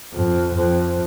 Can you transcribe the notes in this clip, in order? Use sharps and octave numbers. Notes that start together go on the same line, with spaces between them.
F2
F2